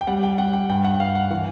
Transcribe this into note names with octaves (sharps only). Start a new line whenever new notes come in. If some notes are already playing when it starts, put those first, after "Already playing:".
G5
G3 F#5
G5
G3 F#5
G5
G2 G5
F#5
G2 F5
F#5
E3 F#5